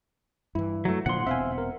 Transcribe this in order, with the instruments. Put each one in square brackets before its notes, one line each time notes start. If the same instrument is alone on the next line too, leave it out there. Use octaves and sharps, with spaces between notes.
[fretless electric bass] G2 E3 [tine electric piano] E4
[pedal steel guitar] F#3 A3
[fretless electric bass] A#2 D3 F3 [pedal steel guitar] F#5 C6
[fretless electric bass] E1 B2 C4 [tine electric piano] E5 F5 G#5
[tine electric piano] A#4